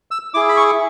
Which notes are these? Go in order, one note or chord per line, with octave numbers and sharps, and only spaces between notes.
E6
E4 G#4 D6
B5
C#6